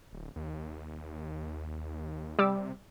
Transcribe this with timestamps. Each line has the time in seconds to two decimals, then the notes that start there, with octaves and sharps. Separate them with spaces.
0.13 D1
0.36 D#2
2.39 C3 G3 D6 E6